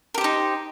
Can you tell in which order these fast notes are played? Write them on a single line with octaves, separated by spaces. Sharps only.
A#4 G4 C5 D#4